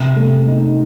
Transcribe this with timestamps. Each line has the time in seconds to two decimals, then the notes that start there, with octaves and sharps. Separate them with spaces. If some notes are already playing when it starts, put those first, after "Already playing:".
Already playing: C3
0.16 A3
0.47 D#4